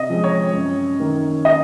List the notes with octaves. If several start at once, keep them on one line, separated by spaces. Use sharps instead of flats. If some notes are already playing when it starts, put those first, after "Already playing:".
Already playing: C3 D#5
F3 G#3 C4
C#5
F#2
D#3 A#3
D#5